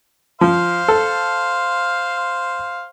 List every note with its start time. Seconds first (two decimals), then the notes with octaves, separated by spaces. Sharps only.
0.41 F3 C5 F5
0.88 A4